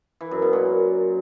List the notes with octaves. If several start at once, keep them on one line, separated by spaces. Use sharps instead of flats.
E3
F#2
B2
A#2